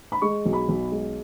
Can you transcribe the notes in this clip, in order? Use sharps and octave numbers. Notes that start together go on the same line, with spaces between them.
B5
G#3 C#6
B1
B5
B1
G#3